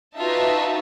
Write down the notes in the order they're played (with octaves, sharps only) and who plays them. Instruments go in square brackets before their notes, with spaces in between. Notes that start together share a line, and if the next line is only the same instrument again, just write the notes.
[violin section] D#4 F#4 B4 E5 A5 [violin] F4